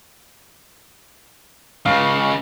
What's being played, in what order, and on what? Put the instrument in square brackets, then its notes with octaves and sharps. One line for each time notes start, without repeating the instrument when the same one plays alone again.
[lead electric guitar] C#2 C#3 [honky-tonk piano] F5